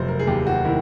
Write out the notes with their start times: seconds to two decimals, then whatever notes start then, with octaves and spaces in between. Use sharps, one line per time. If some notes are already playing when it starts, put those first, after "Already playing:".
Already playing: F1 F#3 C5
0.08 A#4
0.19 G#4
0.27 D#2 G4
0.47 F#4
0.65 D#3 E4